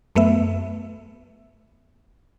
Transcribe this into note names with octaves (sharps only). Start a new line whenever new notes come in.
F#2 A3 B3 E5